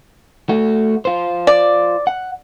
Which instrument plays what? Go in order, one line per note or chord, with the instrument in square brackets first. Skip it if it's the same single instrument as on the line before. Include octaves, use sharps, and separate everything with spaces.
[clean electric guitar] A3 F#4
F4 C5
[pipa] D5
[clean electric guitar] F#5